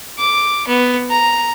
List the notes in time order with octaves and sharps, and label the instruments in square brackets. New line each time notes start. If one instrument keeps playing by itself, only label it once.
[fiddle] D6
B3
A#5